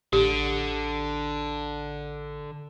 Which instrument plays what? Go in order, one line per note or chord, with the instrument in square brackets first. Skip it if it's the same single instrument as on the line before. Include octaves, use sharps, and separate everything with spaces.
[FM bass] A1 [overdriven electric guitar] D3 [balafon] G4